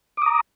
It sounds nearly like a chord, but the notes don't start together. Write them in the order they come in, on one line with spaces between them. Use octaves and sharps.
D6 D#6 A#5